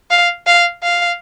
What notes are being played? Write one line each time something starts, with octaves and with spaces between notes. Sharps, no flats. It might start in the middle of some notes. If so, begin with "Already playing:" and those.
F5
F5
F5